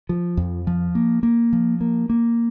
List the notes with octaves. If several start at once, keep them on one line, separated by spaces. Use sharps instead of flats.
F3
F2
F3
A#3
A#3
F3
A#3
A#3